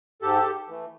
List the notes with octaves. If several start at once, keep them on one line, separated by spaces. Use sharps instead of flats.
G#2 G4 A4
E3 A3